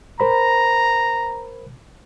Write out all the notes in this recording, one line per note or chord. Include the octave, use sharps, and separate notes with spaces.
A#4 C5 A#5 B5